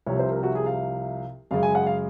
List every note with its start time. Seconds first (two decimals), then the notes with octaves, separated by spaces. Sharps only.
0.07 C2 C3 F3 C#5
0.19 C5
0.30 A#4
0.43 F#4
0.55 G#4
0.66 F5
1.51 F#2 C#3 G#3 F5
1.63 G#5
1.75 F#5
1.86 F5